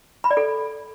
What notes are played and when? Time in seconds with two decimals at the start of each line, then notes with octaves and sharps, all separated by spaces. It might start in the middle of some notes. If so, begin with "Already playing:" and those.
0.24 B5
0.31 D5
0.37 A4